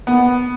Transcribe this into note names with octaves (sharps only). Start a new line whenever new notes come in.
B3